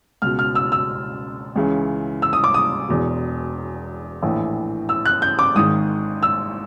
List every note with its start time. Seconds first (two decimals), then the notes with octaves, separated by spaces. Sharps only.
0.22 C#2 B2 F6
0.39 F6
0.55 E6
0.72 E6
1.56 C#2 C#3 E3
2.22 E6
2.33 D#6
2.44 D6
2.54 D#6
2.89 E1 E2 B2
4.22 A#1 A2 E3
4.89 E6
5.06 F#6
5.22 G6
5.39 D6
5.55 G#1 G#2 D#3 D#6
6.23 E6